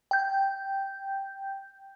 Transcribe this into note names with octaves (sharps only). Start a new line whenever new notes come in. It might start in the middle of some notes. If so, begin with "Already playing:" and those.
G5 G6